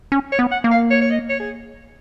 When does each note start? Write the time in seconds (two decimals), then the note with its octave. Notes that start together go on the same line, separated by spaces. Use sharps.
0.12 C#4
0.32 C#5
0.39 B3
0.51 F#5
0.64 A#3
0.71 F5
0.90 C#5
1.01 C#5
1.10 D#5
1.29 C#5
1.40 G#4